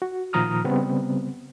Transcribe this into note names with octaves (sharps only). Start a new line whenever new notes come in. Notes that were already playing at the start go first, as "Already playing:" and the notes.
F#4
A#2 D#3 F3 A#5 D#6 F6
C#3 G3 B3 C4